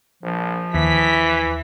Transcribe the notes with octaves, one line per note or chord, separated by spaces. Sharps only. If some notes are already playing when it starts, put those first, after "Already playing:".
A#1 F3
D#2 E3 B6